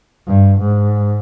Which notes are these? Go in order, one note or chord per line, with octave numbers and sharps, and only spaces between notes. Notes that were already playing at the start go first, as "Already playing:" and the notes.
G2
G#2